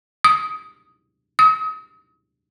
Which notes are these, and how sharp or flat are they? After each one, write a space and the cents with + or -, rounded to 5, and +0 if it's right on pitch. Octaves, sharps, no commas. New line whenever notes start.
D#6 +5
D#6 +35